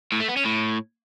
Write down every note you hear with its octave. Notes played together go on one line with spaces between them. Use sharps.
A2
A3
B3
C#4
A2